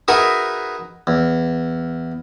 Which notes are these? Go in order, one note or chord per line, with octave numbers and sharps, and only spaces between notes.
D#4 F#4 G#4 A#4 B4 E5
E2